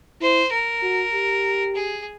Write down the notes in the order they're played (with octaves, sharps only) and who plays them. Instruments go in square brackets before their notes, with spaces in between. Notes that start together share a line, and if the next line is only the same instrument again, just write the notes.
[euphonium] E4 [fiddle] C5
[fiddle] A#4
[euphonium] F#4
G4
[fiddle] G#4